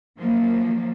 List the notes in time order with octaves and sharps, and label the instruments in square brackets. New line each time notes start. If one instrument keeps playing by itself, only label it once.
[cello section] D#3 F3 F#3 A#3